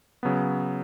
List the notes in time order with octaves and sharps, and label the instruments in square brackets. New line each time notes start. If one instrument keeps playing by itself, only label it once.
[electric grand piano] C#3 F#3 B3